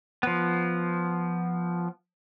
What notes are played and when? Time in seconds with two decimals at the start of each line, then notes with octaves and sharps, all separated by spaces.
0.23 F3 B3